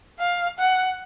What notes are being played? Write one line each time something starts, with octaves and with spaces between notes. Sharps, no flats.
F5
F#5